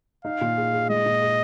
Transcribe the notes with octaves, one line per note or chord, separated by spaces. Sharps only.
D#4 F5
A#2
G#4
G#4
G#3 D#5
A#2
G#4